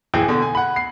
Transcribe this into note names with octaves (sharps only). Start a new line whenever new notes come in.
D1 E3 G#4 G5
B2 D3
G#5
F#5 B5
C7